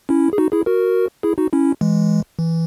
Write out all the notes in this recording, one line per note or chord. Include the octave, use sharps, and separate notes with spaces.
C#4 E4
G#4
D#4 F#4
E4 G#4
F#4 A#4
E4 G#4
D#4 F#4
C#4 E4
E3 G#3
E3